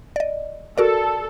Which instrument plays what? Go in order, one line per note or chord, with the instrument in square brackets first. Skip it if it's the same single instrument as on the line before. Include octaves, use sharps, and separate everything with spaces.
[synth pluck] D5 D#5
[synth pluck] F#4 A#4 D5 [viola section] A4